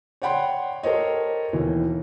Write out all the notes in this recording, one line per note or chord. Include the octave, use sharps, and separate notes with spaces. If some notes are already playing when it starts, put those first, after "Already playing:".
C#5 D5 F#5 G5 B5 C6
G4 A4 A#4 C5 C#5 D#5
D#2 B2 E3